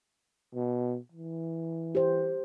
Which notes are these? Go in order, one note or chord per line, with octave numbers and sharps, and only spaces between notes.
B2
E3
G4 C5